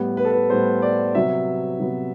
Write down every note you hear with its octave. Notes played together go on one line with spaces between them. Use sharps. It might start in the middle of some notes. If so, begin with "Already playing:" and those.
Already playing: A2 G3 B3
B4
A4
B4
A2 G3 B3 C5
D5
C3 F#3 B3 E5
C3 F#3 B3